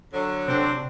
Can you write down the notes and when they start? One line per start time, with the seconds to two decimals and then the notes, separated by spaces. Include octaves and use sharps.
0.14 D3 F#3
0.48 C3 C4 D4